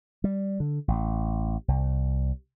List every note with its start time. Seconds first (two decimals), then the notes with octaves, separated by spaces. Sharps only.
0.24 G3
0.60 D3
0.88 A1
1.68 C2